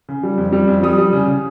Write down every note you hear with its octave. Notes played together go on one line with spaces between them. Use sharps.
C#3
G3
F2
G3
F2
G3 D#6
G3
C#3
C#3